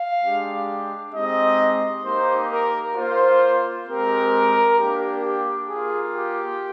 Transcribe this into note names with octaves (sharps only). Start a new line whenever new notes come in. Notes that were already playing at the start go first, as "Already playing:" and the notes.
Already playing: F5
G#3 D4 G4
G#3 C4 D#4 G4 D#5
A#3 D#4 G4 C5
A#4
A#3 F4 C5
G#3 C4 G4 A#4
A#3 D4 G4
G4
A#3 F4 G#4
G4